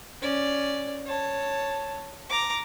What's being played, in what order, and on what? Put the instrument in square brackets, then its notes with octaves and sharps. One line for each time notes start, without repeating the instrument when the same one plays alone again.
[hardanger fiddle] C#4 D5
C#5 A5
A#5 D6